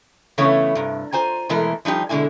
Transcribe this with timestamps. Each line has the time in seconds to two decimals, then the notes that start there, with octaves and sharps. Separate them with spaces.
0.38 C#3 E3 A3 B3 C#4 C#5
0.75 G2 C3
1.13 F4 C5 G#5 A#5
1.49 B2 E3 G#3 A3 A#4
1.85 F3 G3 D#4 G4
2.09 B2 D3 G#3 E4 G#5